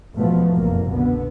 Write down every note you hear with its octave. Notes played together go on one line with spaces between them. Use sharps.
E2 B2 F3 A3 B3
F#1 C2 F2 A#2 A3 A#3
B2 D3 B3